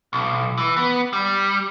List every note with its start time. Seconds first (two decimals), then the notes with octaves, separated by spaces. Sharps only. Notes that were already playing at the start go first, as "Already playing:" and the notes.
0.13 B1
0.58 E3
0.76 B3
1.13 G3